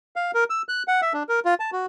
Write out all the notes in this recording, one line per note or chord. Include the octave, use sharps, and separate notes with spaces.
F5
A#4
E6
F#6
F#5
E5
D4
A#4
F4
A5
F#4